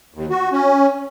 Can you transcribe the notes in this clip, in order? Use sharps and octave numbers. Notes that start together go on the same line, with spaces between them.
D#2
F#4
C#4